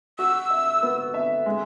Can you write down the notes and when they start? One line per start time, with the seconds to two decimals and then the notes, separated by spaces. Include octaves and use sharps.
0.18 F#4 E6
0.50 E5
0.83 B3
1.14 E5
1.46 G#3